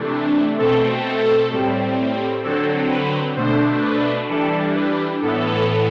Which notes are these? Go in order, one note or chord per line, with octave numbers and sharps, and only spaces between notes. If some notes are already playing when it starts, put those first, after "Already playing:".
Already playing: C3 E3 A3 D4
B2 A3 C4 A4
A4
A2 G3 C4
D3 F#3 C4 A4
B4
B2 A3 D4 C5
B4
E3 G3 D4 A4
B4
A2 E3 B3 A4